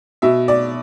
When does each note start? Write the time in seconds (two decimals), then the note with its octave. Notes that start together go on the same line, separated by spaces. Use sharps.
0.22 B2 E5
0.48 D5